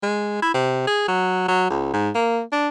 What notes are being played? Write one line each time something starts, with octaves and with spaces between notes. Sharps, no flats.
G#3
E4
C3
G#4
F#3
F#3
C#2
G#2
A#3
D4